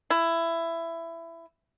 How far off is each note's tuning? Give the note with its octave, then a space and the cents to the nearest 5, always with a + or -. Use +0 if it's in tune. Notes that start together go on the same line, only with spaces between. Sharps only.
E4 +15